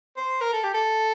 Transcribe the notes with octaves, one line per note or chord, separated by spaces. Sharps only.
C5
A#4
A4
G4
A4